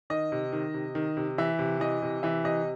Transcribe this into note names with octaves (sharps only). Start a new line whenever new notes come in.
D#3 D#5
C3
D#3
C3
D#3
C3
E3 E5
C3
E3 D#5
C3
E3 E5
C3 D#5